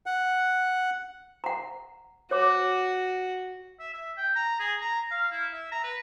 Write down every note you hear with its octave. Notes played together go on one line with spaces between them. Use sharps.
F#5
F#5 A#5
F#4 C#5 D6
E5
E5
G5
A#5
G#4
A#5
F5
E4
E5
A#5
B4